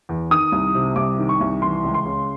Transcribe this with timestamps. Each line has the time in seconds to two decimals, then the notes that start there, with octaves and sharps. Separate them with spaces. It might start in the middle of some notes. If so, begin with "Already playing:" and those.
0.09 E2
0.30 D#3 D#6
0.52 C2
0.75 C3
0.96 C2 D6
1.18 D#3
1.29 C#6
1.41 C2
1.62 E3 C6
1.84 C#2
1.94 C6
2.06 C#3